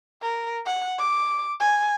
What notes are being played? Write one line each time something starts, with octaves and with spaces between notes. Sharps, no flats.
A#4
F#5
D6
G#5